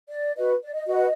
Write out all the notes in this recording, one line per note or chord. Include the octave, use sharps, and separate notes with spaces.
D5
F#4 B4 D#5
D5
D#5
F#4 B4 D#5